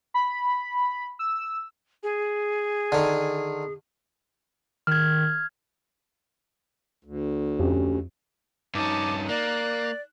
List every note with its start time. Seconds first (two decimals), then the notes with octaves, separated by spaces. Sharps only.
0.14 B5
1.19 E6
2.03 G#4
2.92 D3 D#3
4.87 D#3 F6 G#6
7.04 D2
7.60 F2 C#4 G4
8.75 G2 C#4 D#4 A5 D6
9.29 A#3 D5 F#6